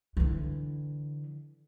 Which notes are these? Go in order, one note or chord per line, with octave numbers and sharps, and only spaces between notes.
D3 E3